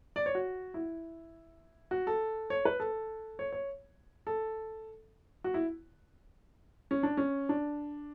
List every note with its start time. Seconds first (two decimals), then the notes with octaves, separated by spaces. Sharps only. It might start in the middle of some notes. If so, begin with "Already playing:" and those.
0.16 D5
0.26 C#5
0.35 F#4
0.74 E4
1.91 F#4
2.07 A4
2.50 C#5
2.65 B4
2.80 A4
3.39 C#5
3.52 C#5
4.27 A4
5.44 F#4
5.54 E4
6.91 C#4
7.03 D4
7.17 C#4
7.49 D4